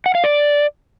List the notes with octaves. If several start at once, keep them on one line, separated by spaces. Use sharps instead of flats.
F#5
F5
D5